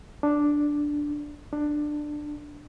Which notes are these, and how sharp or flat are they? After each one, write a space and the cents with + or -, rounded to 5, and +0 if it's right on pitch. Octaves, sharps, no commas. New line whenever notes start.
D4 +0
D4 +15